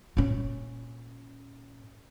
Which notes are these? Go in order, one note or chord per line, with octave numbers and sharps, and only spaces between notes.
A#2 C#4